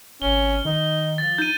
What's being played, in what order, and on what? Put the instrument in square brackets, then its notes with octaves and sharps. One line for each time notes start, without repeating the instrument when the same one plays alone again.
[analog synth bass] G#1 [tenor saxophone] C#4 [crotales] G7
[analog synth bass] D#3 [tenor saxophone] D#4
[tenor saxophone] F3 [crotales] A6
[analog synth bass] D#4 [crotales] G6 D#7